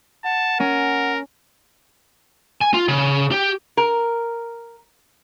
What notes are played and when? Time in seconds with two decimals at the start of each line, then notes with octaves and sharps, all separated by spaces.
0.24 F#5 A5
0.60 C#4 A#4
2.61 G#5
2.74 F4
2.88 C#3
3.32 G4
3.77 A#4